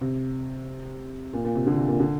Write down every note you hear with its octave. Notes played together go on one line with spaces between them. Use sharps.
C3
A#2
A#2
C3
D3
C3
A#2
D3